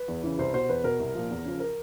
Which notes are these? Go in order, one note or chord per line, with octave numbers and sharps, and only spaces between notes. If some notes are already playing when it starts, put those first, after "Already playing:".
Already playing: B4
E2
C#3 E3
C2 C5
B2 C5
E2 B4
B2 A#4
C2
A#2 F3
E2
C#3 F3
A#4